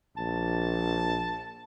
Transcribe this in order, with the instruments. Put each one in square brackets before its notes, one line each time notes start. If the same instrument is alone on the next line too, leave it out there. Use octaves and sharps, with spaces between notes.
[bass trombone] A#1 [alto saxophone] A5